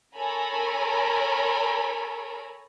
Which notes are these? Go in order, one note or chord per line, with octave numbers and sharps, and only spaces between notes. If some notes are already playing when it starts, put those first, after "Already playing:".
A4 A#4 C#5 G#5 A#5 B5